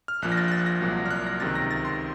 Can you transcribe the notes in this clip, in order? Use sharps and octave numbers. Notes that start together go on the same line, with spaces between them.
F6
A#1 A#2 F3 F#6
A#6
A6
F#6
A6
A#6
C2 A#2 F#3
F6
F#6
A#6
C#2 C3 D#3 A6
A#6
A6
C6